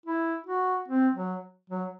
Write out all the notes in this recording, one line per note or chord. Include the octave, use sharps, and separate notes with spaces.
E4
F#4
C4
F#3
F#3